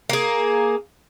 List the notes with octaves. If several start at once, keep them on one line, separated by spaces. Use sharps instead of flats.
A#3 G#4